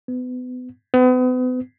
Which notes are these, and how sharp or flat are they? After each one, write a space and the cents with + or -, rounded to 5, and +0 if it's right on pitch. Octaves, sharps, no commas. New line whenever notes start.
B3 +30
B3 +40